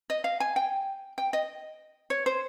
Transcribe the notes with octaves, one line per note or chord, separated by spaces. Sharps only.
D#5
F5
G#5
G5
G5
D#5
C#5
C5